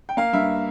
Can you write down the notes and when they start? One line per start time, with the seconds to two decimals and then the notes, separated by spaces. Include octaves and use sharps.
0.09 G5
0.17 A#3 F5
0.33 G2 E5